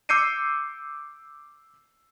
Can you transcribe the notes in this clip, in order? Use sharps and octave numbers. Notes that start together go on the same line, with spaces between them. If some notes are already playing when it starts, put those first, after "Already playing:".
D6 E6 G6 C7 C#7 D#7